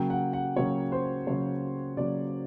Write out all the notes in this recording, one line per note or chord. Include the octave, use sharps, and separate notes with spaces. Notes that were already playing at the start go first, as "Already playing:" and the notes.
Already playing: C#3 F#3 A#3 G5
F#5
F#5
C#3 F#3 A#3 C#5
C5
C#3 F#3 A#3 C#5
C#3 F#3 A#3 D5